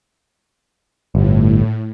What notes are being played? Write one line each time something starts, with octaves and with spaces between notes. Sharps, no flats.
G1 A2